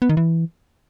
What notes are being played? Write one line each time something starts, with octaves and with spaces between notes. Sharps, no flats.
B3
D#3
E3